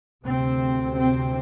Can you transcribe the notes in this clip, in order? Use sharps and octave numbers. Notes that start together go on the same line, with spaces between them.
D2 C3 C4
C4